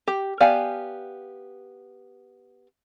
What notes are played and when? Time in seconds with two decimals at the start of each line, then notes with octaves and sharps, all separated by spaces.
0.08 G4
0.40 B3 G4 D5 F5 G#5